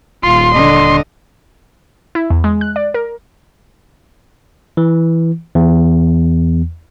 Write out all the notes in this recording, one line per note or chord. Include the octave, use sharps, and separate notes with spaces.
D#1 F4 C6
D3 D#5
E4
E2
G#3
F#6
D5
A#4
E3
E2